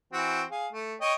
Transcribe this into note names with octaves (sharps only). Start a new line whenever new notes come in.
E3 C4 F#4
G#4 F5
A3
C#5 D#5 G5